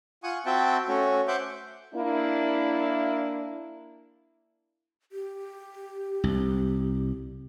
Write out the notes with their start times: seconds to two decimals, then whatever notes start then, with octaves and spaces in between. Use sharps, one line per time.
0.23 F4 F#5 G#5 C#6 D#6
0.46 C4 F#4 E5 G5 A5
0.88 A3 C#4 F#4 C#5
1.28 C5 E5 F#5 D6 G6
1.94 A#3 D4 E4
5.12 G4
6.24 C2